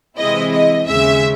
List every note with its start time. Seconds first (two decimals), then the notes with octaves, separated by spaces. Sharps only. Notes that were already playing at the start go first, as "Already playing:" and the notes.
0.18 C3 E3 G#3 C4 E4 D#5
0.52 D#5
0.86 D#2 C#3 G#3 C#4 E5